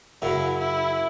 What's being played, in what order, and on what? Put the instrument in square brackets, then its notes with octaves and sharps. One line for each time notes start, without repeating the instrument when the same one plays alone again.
[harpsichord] F#2 C#3 F#3 [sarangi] E4
[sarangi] E4